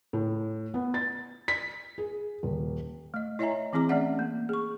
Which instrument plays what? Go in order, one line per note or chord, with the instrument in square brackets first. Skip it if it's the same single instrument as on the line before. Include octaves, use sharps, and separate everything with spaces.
[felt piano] A2
B3
A6
B6
G#4
D#1
[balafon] A3 D#5
E4 C#5 D#5 E5 G#5 A#5
E3 C4 E4 G#4 A#5 D6
A3 C#4 D5 E5 F#5
A#3
G#4 C#6